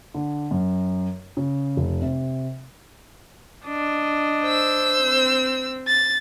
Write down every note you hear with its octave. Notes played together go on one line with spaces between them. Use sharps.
D3
F#2
C#3
F1
C3
D4 D#5
C5 E6
C4
A6